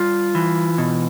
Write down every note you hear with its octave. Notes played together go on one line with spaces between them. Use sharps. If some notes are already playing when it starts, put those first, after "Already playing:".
Already playing: G3 F4
E3
B2